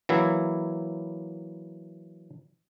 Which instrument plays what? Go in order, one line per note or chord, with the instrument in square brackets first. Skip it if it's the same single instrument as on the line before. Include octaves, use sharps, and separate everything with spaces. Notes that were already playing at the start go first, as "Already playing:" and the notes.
[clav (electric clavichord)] E3 F#3 A#3 E4